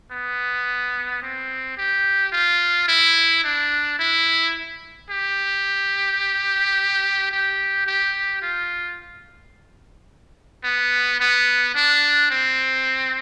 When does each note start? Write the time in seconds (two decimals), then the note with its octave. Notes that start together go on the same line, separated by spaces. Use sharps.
0.11 B3
1.22 C4
1.77 G4
2.32 F4
2.88 E4
3.44 D4
3.99 E4
5.10 G4
7.31 G4
7.87 G4
8.42 F4
10.64 B3
11.20 B3
11.75 D4
12.30 C4